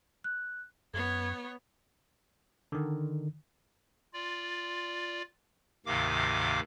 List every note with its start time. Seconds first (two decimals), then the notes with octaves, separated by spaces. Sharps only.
0.24 F#6
0.94 F#2 B3 C#5 G#6
2.72 D3 D#3
4.14 F4 D5
5.86 D2 G#2 C3 D#3 F5 D6